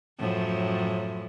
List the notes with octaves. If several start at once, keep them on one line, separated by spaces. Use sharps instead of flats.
F#2 A2 F3